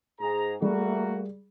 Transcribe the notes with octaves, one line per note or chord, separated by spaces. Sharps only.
G#2 G#4 A#5
G3 A3 A#3 F#4 G#4